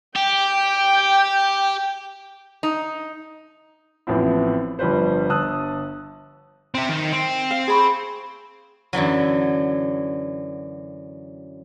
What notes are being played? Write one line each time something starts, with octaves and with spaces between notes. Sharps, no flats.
G4 G5
D#4
A1 A2 F3 B3 C4 E4
G1 F3 G3 B4 C5
G1 A5 D#6 E6 F#6
C4 E5
D#3
C4
F5
G#4 B5 C#6
F#2 D3 E3 F#3